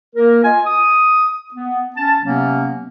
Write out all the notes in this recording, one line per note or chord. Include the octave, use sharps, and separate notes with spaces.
A#3 A#4
F4 D#5 G#5
D#6
B3
C#4 A5
C3 F#3 A#3 B3 C#4